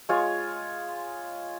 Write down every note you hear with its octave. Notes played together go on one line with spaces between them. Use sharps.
G#3 F4 C#5